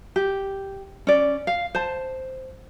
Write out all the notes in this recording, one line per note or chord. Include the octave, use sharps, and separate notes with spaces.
G4
C#4 D5
F5
C5 A5